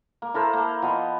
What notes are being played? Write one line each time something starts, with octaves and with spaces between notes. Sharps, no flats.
A#3
E4 A4 A#4 C5
A#3
F3 B3 D#5